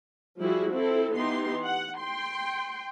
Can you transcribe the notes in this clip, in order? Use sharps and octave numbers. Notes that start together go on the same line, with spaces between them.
F3 G3 E4 F#4 G#4
C4 E4 A4
E3 B3 D#4 G4 C6
F#5
G5 C6